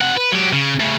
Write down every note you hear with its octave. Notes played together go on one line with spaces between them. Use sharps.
C3 F#5
B4
F#3 G4
C#3
A2 C#3